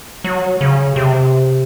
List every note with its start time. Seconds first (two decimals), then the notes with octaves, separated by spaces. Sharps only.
0.24 F#3
0.61 C#3
0.96 C3